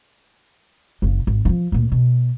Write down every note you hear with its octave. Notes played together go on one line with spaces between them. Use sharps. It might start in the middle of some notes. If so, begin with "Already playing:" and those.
F#1 C#3
G#1
E3 F3
D2 A#2
B2